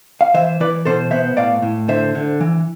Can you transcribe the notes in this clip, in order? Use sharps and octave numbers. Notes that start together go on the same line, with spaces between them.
F5
E3 C5 E5
E3 B4 D5
B2 A4 C5
B3 C5 E5
A2 D5 F5
A2
D3 C5 E5
D3
E3